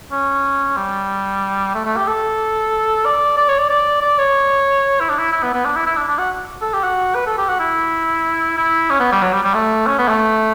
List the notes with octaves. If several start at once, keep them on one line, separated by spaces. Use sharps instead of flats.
C#4
G3
A3
A3
G4
A4
D5
D5
C#5
D5
D5
D5
C#5
E4
D4
E4
E4
B3
B3
D4
E4
E4
D4
D4
F#4
A4
G4
F#4
B4
A4
G4
F#4
E4
E4
C#4
B3
G3
F#3
G3
G3
A3
C#4
B3
A3